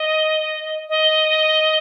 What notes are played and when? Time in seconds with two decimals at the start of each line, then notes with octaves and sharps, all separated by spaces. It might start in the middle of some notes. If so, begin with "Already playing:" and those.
Already playing: D#5
0.89 D#5